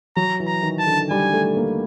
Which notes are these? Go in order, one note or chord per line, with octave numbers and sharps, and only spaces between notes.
F#3 A#5
E3
A#5
D#3
A5
D3
G3 G#5
A3
A#3